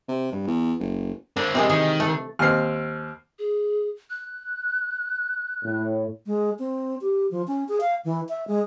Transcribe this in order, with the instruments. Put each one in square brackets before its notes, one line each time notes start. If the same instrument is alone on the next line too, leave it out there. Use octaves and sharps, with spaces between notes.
[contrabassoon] C3
G2
E2
F#1
[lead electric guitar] C4 A#4 [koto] D4
[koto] C3 E3 G#3 [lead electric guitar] C4 A#4
[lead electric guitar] D#3 [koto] G#4
[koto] A3
[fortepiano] D#2 C4 [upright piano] F6 C7
[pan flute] G#4
F#6
[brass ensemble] A2
[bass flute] G#3
C4
G4
F3
C#4
G#4
F5
E3
E5
G#3